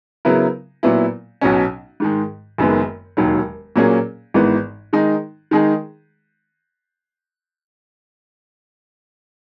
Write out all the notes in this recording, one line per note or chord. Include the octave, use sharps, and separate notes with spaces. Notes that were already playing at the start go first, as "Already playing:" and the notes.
C#3 F#3 B3 E4 A#4
A#2 F#3 B3 E4
B1 B2 F#3 C#4
G#2 D#3 G#3
F#1 F#2 D#3 G#3 B3
E1 D#2 D#3 F#3
A#2 F#3 A#3 C#4 G#4
G#1 G#2 E3 B3
D#3 G#3 D#4
D#3 G#3 D#4 G#4